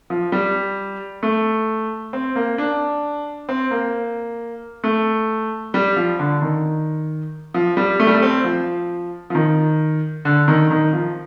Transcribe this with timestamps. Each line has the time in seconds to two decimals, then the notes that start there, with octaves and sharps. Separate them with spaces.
0.10 F3
0.32 G3
1.23 A3
2.13 C4
2.36 A#3
2.58 D4
3.49 C4
3.71 A#3
4.84 A3
5.74 G3
5.96 F3
6.19 D3
6.42 D#3
7.54 F3
7.77 G3
8.00 A3
8.07 G3
8.15 A3
8.22 C4
8.44 F3
9.30 F3
9.35 D#3
10.25 D3
10.48 D#3
10.71 D#3
10.93 F3